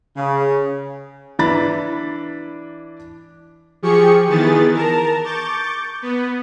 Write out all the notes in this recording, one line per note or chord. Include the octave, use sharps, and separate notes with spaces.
C#3
E3 D4 B5 A6
F3 G4 G#4 C#6 C#7
D#3 E3 B3 G#4 A6
A#4 A5 A#5
C#6 D6 G6 A6
B3